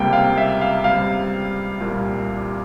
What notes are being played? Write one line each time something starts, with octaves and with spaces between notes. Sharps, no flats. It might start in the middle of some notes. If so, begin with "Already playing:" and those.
Already playing: C#2 C3 G3 A#3 G5
F5
E5
F5
C#2 C3 G3 F5
C2 A#2 G3 A#3